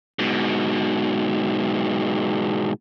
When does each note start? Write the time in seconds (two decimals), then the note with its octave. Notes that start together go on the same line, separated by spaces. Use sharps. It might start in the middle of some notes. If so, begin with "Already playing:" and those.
0.19 G#2 B2